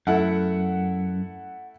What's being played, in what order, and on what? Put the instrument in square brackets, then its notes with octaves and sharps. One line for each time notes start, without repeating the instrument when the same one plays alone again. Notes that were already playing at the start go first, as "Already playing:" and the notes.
[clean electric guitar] F#2 [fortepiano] A3 E4 A4 [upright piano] F#5